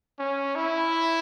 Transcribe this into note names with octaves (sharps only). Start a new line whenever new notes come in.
C#4
E4